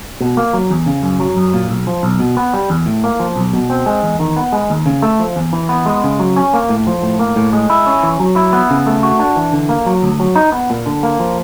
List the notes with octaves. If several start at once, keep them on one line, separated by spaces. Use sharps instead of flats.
B2
A#3
F#3
E2
C#3
F#2
F#3
F#2
A#2
B1
F3
B1
B2
B3
G3
E2
A2
A#3
F3
B1
B2
C4
G#3
E2
D#3
B3
G#3
D#2
C#3
A3
F3
E2
E3
B3
G#3
C#3
F#3
C#4
A#3
A2
F3
A2
A#3
A2
G#3
E4
C#4
E3
F#3
E4
B3
C#3
A3
F#4
D4
E3
D3
A#3
F#3
D2
F#3
D#4
B3
A#2
D3
A#3
F3